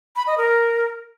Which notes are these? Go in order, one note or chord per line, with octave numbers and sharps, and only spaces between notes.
B5
D#5
A#4